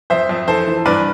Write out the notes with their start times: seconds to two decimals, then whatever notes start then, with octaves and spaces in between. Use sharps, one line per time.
0.10 F2 C5 E5
0.29 F2
0.48 E3 A4 C5
0.67 E3
0.86 G2 B4 D5